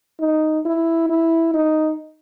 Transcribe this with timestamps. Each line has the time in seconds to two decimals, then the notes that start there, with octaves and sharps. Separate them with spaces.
0.19 D#4
0.65 E4
1.09 E4
1.54 D#4